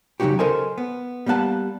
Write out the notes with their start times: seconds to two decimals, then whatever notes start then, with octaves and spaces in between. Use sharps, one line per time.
0.20 C#3 F#3 G3 D#4 F#4 G4
0.39 A4 A#4 C5 D#5 G#5
0.78 B3
1.26 G3 A#3 B3 F#5 A5